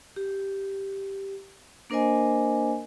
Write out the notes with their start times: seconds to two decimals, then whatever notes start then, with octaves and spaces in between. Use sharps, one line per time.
0.16 G4
1.90 A#3 D4 A#4 C5 D#5 G#5